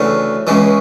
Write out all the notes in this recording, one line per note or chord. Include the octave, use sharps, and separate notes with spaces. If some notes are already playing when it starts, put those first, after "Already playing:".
Already playing: D2 C#3 E3
C#2 C#3 E3